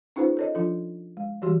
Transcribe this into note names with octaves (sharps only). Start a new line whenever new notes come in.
C#4 D#4 F4 G#4 B4 C5
A4 C#5 D#5
F3 D4 F4 A4
G#3
E3 G3 F#4 G4 C6